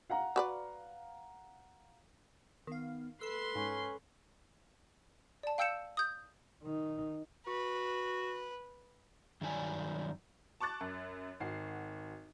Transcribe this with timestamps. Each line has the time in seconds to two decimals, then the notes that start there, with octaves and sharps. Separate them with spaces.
0.10 F5 F#5 A#5
0.36 F#4 B4 D5
2.67 D#3 B3 F5
3.21 A4 B4 C6 E6 C7
3.55 G#2 C#4
5.43 D5 A5
5.58 F5 G5 E6 G6 C#7 E7
5.97 D#6 G6
6.62 D#3 D#4
7.47 F#4 B4
9.41 G2 D#3 F#3 D#4 D5 G#5
10.60 A5 C#6 D6 F#6 A6
10.81 F#2
11.40 G#1 F#4 C7